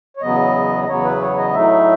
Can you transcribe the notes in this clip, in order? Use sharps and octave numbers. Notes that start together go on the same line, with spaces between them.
C#5
E2 C#3 F#3 B3 D#5
D#5
E2 C#3 F#3 B3 C#5
B4
C#5
D#5
A2 F#3 A3 D#4 E5